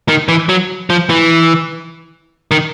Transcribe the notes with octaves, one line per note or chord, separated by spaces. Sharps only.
D#3
E3
F#3
F3
E3
D#3